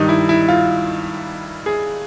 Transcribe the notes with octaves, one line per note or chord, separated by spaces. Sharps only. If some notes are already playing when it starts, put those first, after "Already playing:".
Already playing: G2 D#3 G3 D#4
E4
E4
F4
G#4